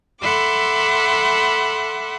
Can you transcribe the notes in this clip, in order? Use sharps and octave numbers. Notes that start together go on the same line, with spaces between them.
A4 E5 F#5 B5 C6 D6